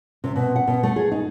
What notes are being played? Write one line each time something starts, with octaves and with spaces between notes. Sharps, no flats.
C3
B2
F#5
B2
A3
G#4
D#4